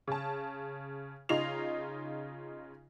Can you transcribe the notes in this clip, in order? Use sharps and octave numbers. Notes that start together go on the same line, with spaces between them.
C#3 A5
C#3 D#4 F4 D#5 C7 F7